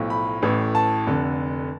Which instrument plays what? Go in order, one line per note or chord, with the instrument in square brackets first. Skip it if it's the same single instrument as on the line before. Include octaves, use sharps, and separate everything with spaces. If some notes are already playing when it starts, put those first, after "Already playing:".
Already playing: [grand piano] B1 A2 F3
B5
A1 A2 E3
A5
F1 F2 D3